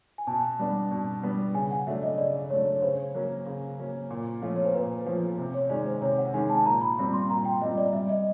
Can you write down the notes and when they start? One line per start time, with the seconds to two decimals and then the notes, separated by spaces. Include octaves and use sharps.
0.18 G#5
0.27 B2 A5
0.59 G3 B3 D4
0.91 B2
1.23 G3 B3 D4
1.54 C#3 G#5
1.71 F#5
1.87 F#3 A3 D4 E5
2.03 D#5
2.18 C#3 D5
2.50 F#3 A3 D4 C#5
2.76 C#5
2.82 C#3 C5
3.15 F#3 A#3 C#4
3.46 C#3
3.78 F#3 A#3 C#4
4.10 A#2
4.42 F3 A3 C#4 F4
4.56 C#5
4.65 C5
4.74 A#2 B4
5.06 F3 A3 C#4 F4 C5
5.38 C3
5.54 C#5
5.69 D#3 G#3 C#4 D5
5.86 C5
6.02 C3 C#5
6.18 F#5
6.34 D#3 G#3 C#4 G#5
6.50 A5
6.66 A#2 A#5
6.81 B5
6.98 G3 C4 F4 B5
7.13 C6
7.30 A#2 A#5
7.45 G5
7.62 G3 C4 F4 D#5
7.78 D5
7.93 G3 E5
8.09 D#5